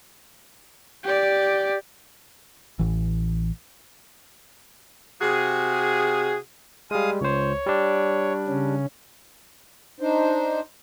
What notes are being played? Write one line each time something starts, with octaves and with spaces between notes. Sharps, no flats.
G4 D5
A1 E3
C3 F#4 G#4
G3 G#3 G#4 F5 D#6
C#2 C5 C#5
G3 D4
C#3 C#4
D4 D#4 C5